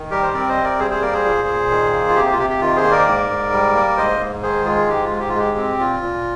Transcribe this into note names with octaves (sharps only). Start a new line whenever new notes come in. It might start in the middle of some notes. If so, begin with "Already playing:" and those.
Already playing: D#3
G3 G4 A#4
C5
C4 A#4 D5
C5 D#5
C3
A#4 D5
G3 G#4 C5
G#4 C5
A#3 A#4 D5
G#4 C5
A#2
A#2
D#3
A#3
F4
C3 G4
F4
C3 G4
G4
D#3 F4
G#4 C5
A#3
A#4 D5
G#2
G#2
G3
A#3
G#2 C5 D#5
G#2
D#3 G#4 C5
G#3 F4 G#4
G#2 G4
F4
G#2
G4
F4
G#3 G4
C4
A#2 F4
A#2